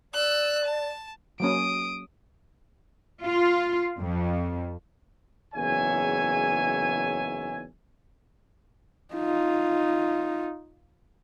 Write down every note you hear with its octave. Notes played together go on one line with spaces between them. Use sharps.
D5 E6 F#6
A5
F#3 A#3 C#4 D#6 D7
F4
F2
F#1 E2 G#2 C#5 E5 G#5
D#4 F4